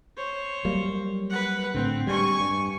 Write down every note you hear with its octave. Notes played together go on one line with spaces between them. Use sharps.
C5 C#5
F#3 G3 A#3
B4 F#5
A2 D3 C4
G3 G#3 D4 G#5 C#6
G2